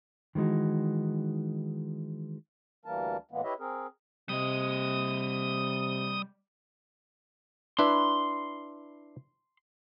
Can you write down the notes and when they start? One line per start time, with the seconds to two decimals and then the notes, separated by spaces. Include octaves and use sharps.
0.35 D#3 E3 G#3 D#4 F#4
2.85 D2 E3 G3 A#3 A#4 A5
3.31 A2 E3 G#3 A#3 B3
3.44 E4 G4 B4 C#5 D#5 E5
3.59 C4 G#4 A#4
4.29 C3 G3 D#5 D#6
7.79 D4 E4 B4 C6